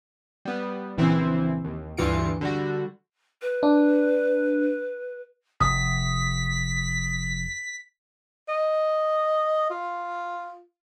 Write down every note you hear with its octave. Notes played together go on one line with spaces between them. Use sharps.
G3 B3
A#1 C#3 E3 C4 E4
D#2
D2 G2 E3 F4 C#7 D7
D3 G3 F#4
B4
D4
F1 D#6 B6
D#5
F4